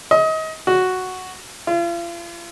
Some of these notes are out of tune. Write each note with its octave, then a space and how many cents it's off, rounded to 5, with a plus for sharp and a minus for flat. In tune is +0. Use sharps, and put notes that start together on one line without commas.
D#5 +30
F#4 +0
F4 -40